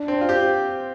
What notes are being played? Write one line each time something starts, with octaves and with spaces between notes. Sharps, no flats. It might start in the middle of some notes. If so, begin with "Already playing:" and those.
Already playing: D4
C4
F4
C4 G4